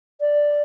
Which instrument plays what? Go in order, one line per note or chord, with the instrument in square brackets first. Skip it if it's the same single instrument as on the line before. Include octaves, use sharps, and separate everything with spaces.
[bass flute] D5